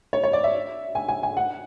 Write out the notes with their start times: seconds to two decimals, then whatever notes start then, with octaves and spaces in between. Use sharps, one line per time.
0.13 C#5
0.23 C#5
0.33 D5
0.44 E5
0.95 G#5
1.08 G#5
1.23 G#5
1.37 F#5